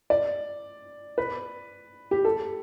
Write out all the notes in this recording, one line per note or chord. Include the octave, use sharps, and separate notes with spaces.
D5
B4
G4
A4